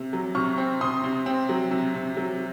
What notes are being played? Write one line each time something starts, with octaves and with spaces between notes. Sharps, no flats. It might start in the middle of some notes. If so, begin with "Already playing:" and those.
Already playing: C3
F#3
C3 C#6 F6
C4
C3 C6 D#6
C3
C4
F#3
C3
C3
F#3